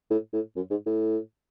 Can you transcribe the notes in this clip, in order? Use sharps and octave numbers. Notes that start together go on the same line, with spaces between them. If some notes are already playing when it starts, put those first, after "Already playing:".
A2
A2
F#2
G#2
A2